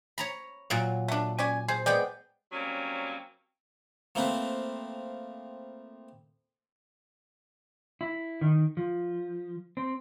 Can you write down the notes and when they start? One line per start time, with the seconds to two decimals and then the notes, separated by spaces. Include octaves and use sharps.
0.18 C#5 A#5 B5
0.70 A#2 F#3 A#3
1.08 A3 D4
1.39 C#4 D5 G#5
1.68 G#4 C5
1.86 G#3 B3 D5 G5
2.52 F#3 G3 A#3 C4 C#4
4.15 F3 A3 A#3 C4 B4
8.01 E4
8.41 D#3
8.77 F3
9.77 C4